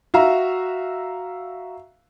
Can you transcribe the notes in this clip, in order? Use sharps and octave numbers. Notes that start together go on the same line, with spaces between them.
F#4 E5 F5 A#5